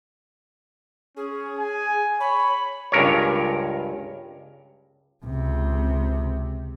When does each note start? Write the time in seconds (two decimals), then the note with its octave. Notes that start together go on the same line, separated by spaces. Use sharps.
1.17 C#4 G#4
1.59 G#5
2.20 C#5 B5
2.92 C#2 G2 A#4 C#5
5.25 C#2 C3